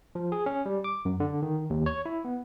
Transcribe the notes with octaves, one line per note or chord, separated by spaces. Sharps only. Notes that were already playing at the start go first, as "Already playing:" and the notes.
F3
G#4
C#4
G3
D6
F#2
D3
D#3
D#2
C#5
E4
B3